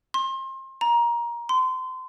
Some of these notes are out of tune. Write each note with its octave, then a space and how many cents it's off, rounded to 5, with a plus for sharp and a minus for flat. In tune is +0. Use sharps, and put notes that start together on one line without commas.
C6 +30
A#5 +20
C6 -30